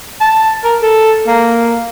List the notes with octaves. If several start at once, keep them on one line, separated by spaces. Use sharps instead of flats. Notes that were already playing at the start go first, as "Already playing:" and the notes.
A5
A#4
A4
A#3